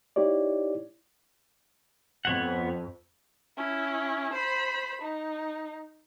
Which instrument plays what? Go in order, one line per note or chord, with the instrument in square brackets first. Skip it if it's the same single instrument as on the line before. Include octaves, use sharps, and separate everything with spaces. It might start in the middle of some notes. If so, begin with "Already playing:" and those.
[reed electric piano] D#4 E4 G4 C#5 D5
[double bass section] F2 [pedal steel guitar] B3 C#5 F#5
[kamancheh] C#4 E4
C5 B5
D#4